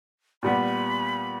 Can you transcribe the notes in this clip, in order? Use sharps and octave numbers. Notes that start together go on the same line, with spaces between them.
A#2 G3 B3 B5